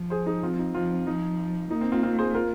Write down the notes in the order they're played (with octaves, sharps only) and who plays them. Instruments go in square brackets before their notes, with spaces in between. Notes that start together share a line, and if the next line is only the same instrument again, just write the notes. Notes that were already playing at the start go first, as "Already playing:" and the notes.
Already playing: [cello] F3
[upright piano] G#4 C5
D#4 G#4
C4 F4
C4
D#4
[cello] F3 [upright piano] C4 F4
[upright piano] C4
[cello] F3 [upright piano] D#4
[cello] A#3 [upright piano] D#4
[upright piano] C4
C4 F4
C4 F4
G#4 C5
F4 A#4